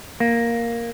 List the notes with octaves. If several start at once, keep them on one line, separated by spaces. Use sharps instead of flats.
A#3